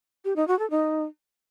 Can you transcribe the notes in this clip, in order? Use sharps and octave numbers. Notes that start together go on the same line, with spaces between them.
G4
D#4
F#4
A4
D#4